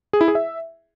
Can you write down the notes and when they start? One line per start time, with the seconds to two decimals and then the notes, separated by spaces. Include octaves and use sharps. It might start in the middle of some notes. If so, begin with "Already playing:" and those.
0.13 G#4
0.21 E4
0.28 G#4
0.35 E5